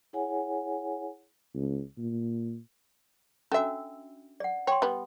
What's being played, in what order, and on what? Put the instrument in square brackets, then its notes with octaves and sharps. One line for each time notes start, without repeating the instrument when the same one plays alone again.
[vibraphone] E4 G#4 C#5 F#5 G#5
[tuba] C#2
A#2
[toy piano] C#4 D4 F#4 [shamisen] A4 E5
[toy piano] D5 F#5
[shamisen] C#5 [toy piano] G5 C6
[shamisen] G3 B3